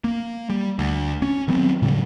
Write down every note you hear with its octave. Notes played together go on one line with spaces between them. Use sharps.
A#3
G3
D2
C#4
D#3 F#3 B3 C4
A2 C#3 F#3 G3